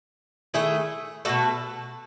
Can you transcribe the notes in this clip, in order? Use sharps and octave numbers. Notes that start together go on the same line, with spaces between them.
D#3 A3 E4 G#4
B2 A3 F#4 A4